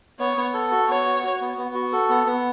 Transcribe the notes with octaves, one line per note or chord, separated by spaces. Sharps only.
B3 C#5
B3
A4
F#4
B3 C#5
F#4
F#4
B3
B3
F#4
A4
B3
B3